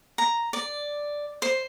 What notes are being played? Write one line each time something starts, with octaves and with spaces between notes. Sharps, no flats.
A#5
D5
C5